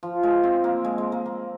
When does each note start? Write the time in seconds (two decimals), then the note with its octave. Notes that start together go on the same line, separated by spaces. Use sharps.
0.03 F3
0.23 G#3
0.43 C4
0.64 A#3
0.84 G#3
0.98 G#3
1.12 A#3
1.26 A#3